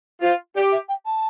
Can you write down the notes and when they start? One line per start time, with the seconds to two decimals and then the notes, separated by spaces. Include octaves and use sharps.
0.22 F4 C5
0.55 G4 D5
0.72 E5
0.89 G5
1.06 A5